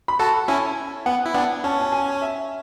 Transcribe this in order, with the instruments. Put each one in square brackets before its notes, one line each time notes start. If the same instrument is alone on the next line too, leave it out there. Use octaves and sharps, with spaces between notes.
[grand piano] B5
[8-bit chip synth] F#4 A4 [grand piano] A5
[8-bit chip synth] C#4 E4 [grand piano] G#5
[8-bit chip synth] B3 [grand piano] F#5
[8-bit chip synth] E4
[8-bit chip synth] B3 D4 [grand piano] F#5
[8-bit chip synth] C#4 [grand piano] A5
[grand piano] A5
G#5
E5